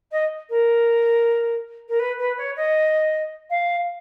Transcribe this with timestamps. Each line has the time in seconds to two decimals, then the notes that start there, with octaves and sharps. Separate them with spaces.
0.11 D#5
0.49 A#4
1.88 A#4
1.99 B4
2.18 B4
2.37 C#5
2.56 D#5
3.50 F5